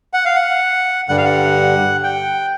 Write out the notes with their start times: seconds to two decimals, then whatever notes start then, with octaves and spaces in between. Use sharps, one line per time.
0.13 F#5
0.25 F5
0.36 F#5
1.09 G2 D3 G3 F#5
1.17 F5
1.25 F#5
2.04 G5